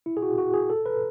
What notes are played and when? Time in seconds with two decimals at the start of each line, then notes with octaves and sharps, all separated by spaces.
0.06 E4
0.17 G#4
0.23 F#4
0.38 F#4
0.54 G#4
0.70 A4
0.86 B4